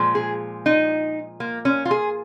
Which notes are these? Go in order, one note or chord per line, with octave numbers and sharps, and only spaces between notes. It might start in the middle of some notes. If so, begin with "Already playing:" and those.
Already playing: A#2 F3 G#3
G#4
D#4
A#3
C#4
F4
G#4